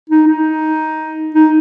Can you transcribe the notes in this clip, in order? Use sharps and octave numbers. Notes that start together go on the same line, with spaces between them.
D#4
D#4
D#4